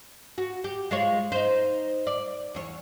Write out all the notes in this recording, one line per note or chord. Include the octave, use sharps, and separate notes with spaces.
F#4
G4
G#3 F4 C#5
D#4 C5
D5
E2 C#5